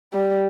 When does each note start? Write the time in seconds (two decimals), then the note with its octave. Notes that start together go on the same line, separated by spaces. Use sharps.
0.13 G3